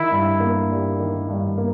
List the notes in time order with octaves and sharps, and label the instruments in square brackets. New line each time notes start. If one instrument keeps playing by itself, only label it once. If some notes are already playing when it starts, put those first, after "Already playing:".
Already playing: [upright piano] D#3 [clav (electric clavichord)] E4
[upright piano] G2
A#3
G3
D#3
G2
A#3